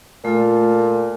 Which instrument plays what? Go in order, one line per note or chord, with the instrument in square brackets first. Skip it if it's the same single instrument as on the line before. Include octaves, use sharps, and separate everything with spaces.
[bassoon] A#2 [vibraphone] A3 F4 A4